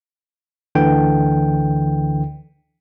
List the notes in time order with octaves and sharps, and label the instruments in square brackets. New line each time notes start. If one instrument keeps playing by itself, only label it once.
[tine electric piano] D2 D3 E3 G5